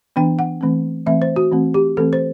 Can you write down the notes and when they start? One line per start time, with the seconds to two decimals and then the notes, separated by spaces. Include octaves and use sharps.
0.16 E3 B3 D4 G5
0.39 F#5
0.61 E3 A3 C4
1.06 E3 A3 C4 E5
1.22 C5
1.36 F#4
1.52 E3 A3 C4
1.74 G4
1.97 E3 A3 C4 A4
2.13 C5